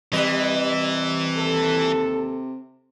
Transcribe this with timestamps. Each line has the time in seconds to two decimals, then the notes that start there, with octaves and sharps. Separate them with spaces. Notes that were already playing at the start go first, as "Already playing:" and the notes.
0.13 C3 E3 G3 B4 D#5
1.36 D#2 A4